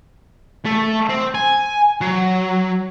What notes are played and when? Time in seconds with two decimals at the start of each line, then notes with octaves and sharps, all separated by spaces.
0.65 A3
1.09 C4
1.35 G#5
2.01 F#3